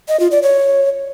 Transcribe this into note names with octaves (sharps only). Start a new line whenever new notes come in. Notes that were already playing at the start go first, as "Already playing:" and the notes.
D#5
F4
D5
C#5